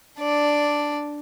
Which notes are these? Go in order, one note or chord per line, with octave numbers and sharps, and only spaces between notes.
D4 D5